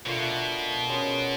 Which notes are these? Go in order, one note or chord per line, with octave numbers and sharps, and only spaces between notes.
B2 A3 D4 F4 A#4
G#3 C#4 F#4 A#4